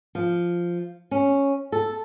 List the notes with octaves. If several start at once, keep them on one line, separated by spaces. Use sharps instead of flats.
F3
C#4
A4